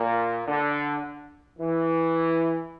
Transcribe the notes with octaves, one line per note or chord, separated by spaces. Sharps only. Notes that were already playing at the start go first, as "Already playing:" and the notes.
Already playing: A#2
D3
E3